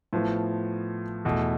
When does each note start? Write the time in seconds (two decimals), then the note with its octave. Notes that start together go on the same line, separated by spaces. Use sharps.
0.13 A2 F3 B3 F4
1.25 E2 B2 A3